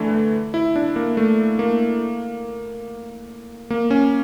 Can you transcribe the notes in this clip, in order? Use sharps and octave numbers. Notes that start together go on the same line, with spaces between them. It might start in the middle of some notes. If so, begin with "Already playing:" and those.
Already playing: D3 E3 A3
A3
E4
D4
A#3
A3
A#3
A#3
C#4